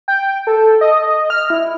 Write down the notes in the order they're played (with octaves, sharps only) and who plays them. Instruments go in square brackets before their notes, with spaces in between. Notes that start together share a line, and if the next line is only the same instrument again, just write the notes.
[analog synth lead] G5
A4
D#5
F6
E4